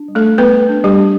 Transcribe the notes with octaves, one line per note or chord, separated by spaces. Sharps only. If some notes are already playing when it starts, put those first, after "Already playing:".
Already playing: D4
G3
A3 A4
G3 B3 B4
D4
G3 G4
D4